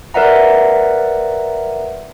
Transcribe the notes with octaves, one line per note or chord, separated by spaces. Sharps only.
A#4 B4 D5 E5 F#5 A#5